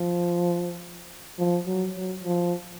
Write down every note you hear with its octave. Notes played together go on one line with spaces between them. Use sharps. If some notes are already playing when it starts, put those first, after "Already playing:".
Already playing: F3
F3
F#3
F#3
F3